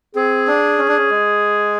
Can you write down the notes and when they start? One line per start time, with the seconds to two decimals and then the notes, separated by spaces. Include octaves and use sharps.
0.15 C4 G#4
0.48 D4
0.78 C#4
0.88 D4
0.97 C#4
1.10 G#3